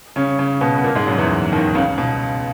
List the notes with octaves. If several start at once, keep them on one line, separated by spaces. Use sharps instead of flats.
C#3 C#4
C#3 C#4
B2 B3
B3
A#2 A#3
G#2 G#3
F#2 F#3
E2 E3
D#2 D#3
C#2 C#3
B2